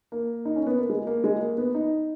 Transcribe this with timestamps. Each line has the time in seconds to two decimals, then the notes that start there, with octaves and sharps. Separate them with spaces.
0.12 A#3
0.45 D#4
0.56 C#4
0.66 B3
0.79 A#3
0.90 G#3
1.07 A#3
1.24 G#3
1.40 A#3
1.58 B3
1.75 D#4